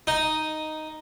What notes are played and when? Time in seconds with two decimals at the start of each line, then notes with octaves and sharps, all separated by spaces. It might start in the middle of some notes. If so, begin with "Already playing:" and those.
0.07 D#4